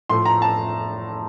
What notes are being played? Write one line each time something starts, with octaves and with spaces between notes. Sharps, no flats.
A2 F3 A3 C6
A#5
A5